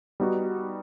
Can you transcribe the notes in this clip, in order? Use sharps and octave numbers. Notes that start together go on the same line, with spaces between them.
G3 B3 D#4 F#4